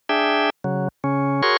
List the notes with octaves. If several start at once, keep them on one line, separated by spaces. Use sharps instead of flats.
D4 G#4 E5 G5
C#3 F#3
C#3 C#4
F#4 G#4 A#4 C#5 C6 C#6